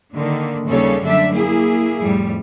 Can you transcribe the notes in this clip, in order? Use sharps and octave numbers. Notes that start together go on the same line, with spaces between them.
D3 D#3 A#3
D#2 C#3 G3 A4 C#5
F#2 D3 G3 A3 D4 E5
A#3 E4 G#4
F2 A2 G3